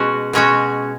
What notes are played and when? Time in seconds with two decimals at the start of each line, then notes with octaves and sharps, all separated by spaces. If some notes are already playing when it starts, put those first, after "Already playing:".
Already playing: B2 G#3 C#4 F#4
0.33 B2 G#3 C#4 F#4